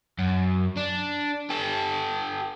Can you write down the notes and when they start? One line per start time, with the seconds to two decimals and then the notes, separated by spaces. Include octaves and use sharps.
0.19 F#2
0.77 D4
1.50 G4 A4